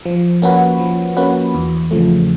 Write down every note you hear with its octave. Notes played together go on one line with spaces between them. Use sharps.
F3
A#3 C#4 F#4 B4
F3
A#3 C#4 F#4 B4
E2
C#3 F3 A3